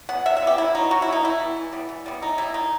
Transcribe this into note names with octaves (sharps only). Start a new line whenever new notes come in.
E3 B3 F#5
C3 E5
E5
E3 B3 G4
C3 E4
F#3 B3 D#4
C3 F#4
E4
F#3 B3 D#4
E3 E4
G3 B3
E3
G3 B3
E3
G3 B3
E3 D#4
G3 B3 E4
D#3 D#4